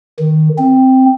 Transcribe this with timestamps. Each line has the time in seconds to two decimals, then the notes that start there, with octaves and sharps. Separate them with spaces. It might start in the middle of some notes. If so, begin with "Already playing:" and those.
0.19 D#3
0.59 C4